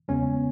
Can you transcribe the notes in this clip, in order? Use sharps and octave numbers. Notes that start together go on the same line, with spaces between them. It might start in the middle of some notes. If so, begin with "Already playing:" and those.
E2 C#3 G#3 B3 C#4